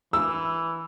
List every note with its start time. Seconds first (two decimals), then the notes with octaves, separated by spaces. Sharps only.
0.13 E3 E6